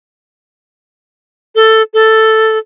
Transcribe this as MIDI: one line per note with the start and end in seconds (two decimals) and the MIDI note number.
1.55 1.82 69
1.94 2.58 69